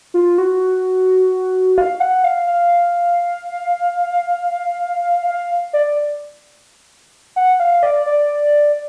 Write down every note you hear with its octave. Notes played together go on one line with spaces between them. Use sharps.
F4
F#4
F5
F#5
F5
F5
F5
D5
F#5
F5
D5
D5